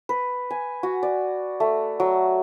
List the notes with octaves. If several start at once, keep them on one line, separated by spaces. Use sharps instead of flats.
B4
G#5
F#4
D5
A3
F#3